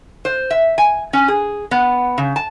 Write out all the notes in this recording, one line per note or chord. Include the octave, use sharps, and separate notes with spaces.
C5
E5
G#5
C#4
G#4
B3
C#3
A5